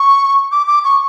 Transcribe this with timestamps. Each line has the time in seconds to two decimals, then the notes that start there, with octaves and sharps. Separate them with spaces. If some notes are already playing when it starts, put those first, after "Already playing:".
Already playing: C#6
0.52 D6
0.68 D6
0.85 C#6